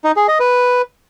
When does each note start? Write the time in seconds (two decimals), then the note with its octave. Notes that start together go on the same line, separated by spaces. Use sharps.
0.04 D#4
0.16 G#4
0.28 D#5
0.40 B4